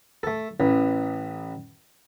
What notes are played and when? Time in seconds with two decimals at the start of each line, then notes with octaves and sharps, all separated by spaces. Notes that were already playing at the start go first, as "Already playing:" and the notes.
0.23 A3 A4
0.60 A1 E3